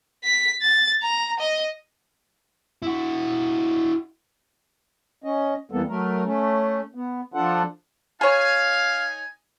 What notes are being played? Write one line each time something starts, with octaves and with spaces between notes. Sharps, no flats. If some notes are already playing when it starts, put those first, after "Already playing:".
B6
A6
A#5
D#5
E4 F#4
C#4 D#5
F2 E3 G3 A#3 B3 A4
F#3 A3 A#4
A3 C#4
B3
F3 D4 F4 A4 F#5
D#4 G#4 C#5 F5 G#5